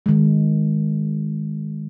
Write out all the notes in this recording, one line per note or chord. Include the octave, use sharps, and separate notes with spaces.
D#3 G#3